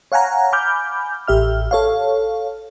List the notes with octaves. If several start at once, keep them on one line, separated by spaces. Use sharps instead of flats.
C#5 F5 F#5 G#5 A#5
G#5 B5 D6 F6 G6
A1 G4 E5 F6
A4 C#5 F5